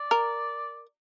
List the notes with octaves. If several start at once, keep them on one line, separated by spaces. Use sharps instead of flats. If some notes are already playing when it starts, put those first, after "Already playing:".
Already playing: D5
A#4